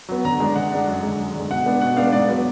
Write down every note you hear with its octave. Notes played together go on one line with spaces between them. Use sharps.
F#3 B3
D3 A#5
G#3 D4
D3 F#5
G#3 D4
F#2
D3 G#3
F#2
D3
G#3
B2 F#5
G#3 B3 D4
B2 F#5
G#3 B3 D4 F5
G#2 D5
F#3 B3